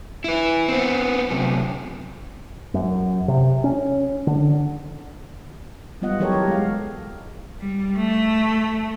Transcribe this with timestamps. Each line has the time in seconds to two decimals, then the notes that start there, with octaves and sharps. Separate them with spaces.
0.24 E4 B4
0.68 B3 C4
1.31 F#2 C3
2.74 F#2
3.28 C3
3.64 C#4
4.27 D3
6.02 G3 B3 F4 D#5 F#5
6.19 E3 F#3 G4 A4 A#4 C#5
6.32 F#4 A#4
6.48 G#3 F5
7.61 G3
7.97 A3